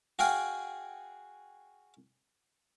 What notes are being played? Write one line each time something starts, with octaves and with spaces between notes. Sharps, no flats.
F#4 G#4 F5 G5